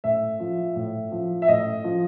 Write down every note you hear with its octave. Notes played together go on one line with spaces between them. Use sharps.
A2 E5
F3
A2
F3
E5
A2 D#5
F3